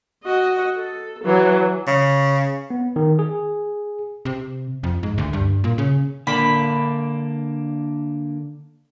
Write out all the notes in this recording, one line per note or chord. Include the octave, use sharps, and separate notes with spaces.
F#4 D#5
A4
E3 F#3
C#3
B3
D#3
G#4
C3
F2
G#2
D2
G2
A#2
C#3
D3 A#3 D4 B5